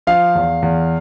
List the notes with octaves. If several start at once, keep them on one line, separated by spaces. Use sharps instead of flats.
F3 F5
E2
E2